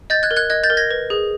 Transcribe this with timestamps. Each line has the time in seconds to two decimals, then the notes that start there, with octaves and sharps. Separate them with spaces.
0.10 D#5 G6 A6
0.23 F#6 G#6
0.31 A#4
0.36 F#6 G#6
0.50 D#5 F#6 G#6
0.63 G6 A6
0.70 A#4
0.77 G#6 A#6
0.91 B4
1.10 G#4